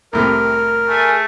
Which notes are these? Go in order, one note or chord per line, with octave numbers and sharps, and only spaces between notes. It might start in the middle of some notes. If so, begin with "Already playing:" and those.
C2 A2 C3 A#4
A3 G#4 G#5